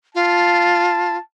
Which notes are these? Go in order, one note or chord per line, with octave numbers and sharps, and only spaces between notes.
F4 A5